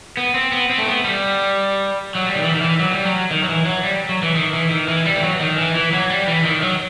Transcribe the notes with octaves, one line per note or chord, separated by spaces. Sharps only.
B3
C4
B3
C4
A3
B3
G3
F#3
G3
D#3
E3
D#3
E3
F#3
G3
F#3
D#3
F#3
E3
F#3
G3
F#3
E3
D#3
E3
D#3
E3
G3
E3
F#3
D#3
E3
E3
F#3
G3
E3
D#3
F#3